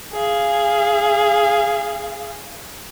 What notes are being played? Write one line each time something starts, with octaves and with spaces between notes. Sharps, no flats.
G#4 F5